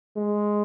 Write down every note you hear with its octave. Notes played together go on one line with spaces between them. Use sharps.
G#3